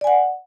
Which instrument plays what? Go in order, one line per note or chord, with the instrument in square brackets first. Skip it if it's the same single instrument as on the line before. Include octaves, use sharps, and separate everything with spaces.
[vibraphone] D5
G#5
F#5